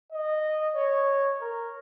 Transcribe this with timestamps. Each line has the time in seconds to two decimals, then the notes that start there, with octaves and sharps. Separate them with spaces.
0.12 D#5
0.76 C#5
1.41 A#4